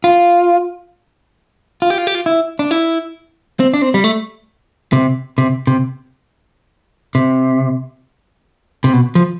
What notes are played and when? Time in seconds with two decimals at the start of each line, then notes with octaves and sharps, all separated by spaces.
0.04 F4
1.82 F4
1.90 G4
1.98 F4
2.07 G4
2.15 F4
2.26 E4
2.59 D4
2.71 E4
3.60 C4
3.74 D4
3.82 C4
3.94 G3
4.04 A3
4.93 C3
5.38 C3
5.67 C3
7.15 C3
8.84 C3
8.93 B2
9.15 F3